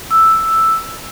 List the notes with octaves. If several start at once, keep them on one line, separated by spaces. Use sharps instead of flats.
E6